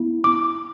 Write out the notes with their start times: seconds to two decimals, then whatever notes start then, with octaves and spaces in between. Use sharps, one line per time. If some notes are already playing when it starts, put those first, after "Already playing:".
Already playing: B3 E4
0.24 D6